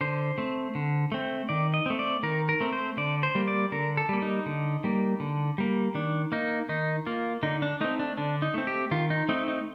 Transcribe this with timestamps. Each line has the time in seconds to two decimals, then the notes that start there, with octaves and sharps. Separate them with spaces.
0.01 D3 C5
0.38 A3 C4
0.75 D3
1.12 A3 C4
1.49 D#3 D5
1.74 D#5
1.86 A3 C4
1.99 D5
2.23 D#3 A#4
2.49 A#4
2.60 A3 C4
2.72 C5
2.97 D3 D5
3.23 C5
3.35 G3 A#3
3.48 D5
3.72 D3 A#4
3.97 A4
4.09 G3 A#3
4.22 D#4
4.46 D3
4.84 G3 A#3
5.20 D3
5.58 G3 A#3
5.95 D#3 D4
6.32 A#3 D#4
6.69 D#3 D#4
7.06 A#3 F4
7.43 D3 D#4
7.62 D4
7.81 A3 C4 D#4
7.99 D4
8.17 D3 D4
8.42 D#4
8.54 A3 C4
8.67 G4
8.91 D#3 F4
9.10 D#4
9.29 A3 C4 D#4
9.48 D#4